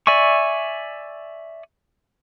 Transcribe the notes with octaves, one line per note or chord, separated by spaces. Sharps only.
D5 E5 G#5 C#6